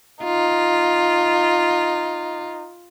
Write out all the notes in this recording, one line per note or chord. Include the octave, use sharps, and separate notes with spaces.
D#4 F4